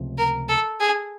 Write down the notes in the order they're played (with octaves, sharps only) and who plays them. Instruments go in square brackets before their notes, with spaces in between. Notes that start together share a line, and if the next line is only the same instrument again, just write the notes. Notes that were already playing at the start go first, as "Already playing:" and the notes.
Already playing: [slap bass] C#2 C3 F3 A3
[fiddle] A#4
A4
G#4